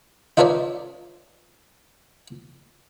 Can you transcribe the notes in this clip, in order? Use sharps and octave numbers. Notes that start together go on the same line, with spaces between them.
D#4 F4 A4 B4 C#5 D5